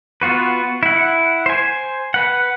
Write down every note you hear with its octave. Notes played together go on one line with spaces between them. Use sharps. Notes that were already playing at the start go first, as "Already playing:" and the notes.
B3 F4 F#4 B4
E4 F#5
C5 G#5
B4 F#5